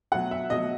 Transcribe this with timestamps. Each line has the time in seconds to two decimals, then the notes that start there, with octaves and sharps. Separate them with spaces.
0.12 B2 F#3 A3 F#5
0.31 E5
0.50 B2 F#3 A3 D#5